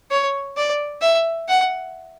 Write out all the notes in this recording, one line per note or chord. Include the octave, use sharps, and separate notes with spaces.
C#5
D5
E5
F#5